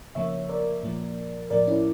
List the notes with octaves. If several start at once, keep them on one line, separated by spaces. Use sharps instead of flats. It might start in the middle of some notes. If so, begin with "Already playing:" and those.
C#3 F3 A#3 C#5 E5
A#4 D5
A#2 F3 A#3
A2 F3 A#3 A#4 D5
C#4 E4